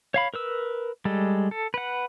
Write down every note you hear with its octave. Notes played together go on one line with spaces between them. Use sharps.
C#5 F5 B5
A#4 B4 E6
G3 G#3 A4
A4
B4 F#5